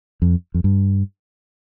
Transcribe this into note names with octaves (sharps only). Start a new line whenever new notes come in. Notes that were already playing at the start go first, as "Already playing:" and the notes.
F2
F2
G2